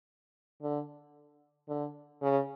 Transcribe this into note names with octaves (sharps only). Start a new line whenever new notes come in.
D3
D3
C#3